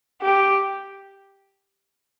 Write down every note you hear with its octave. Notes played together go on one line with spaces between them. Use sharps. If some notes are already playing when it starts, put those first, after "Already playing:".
G4